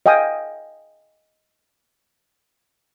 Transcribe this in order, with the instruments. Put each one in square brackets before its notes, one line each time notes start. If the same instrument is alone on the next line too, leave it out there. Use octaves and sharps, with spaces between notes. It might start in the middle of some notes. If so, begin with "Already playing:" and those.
[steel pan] D#5 F5 G5 G#5 D#6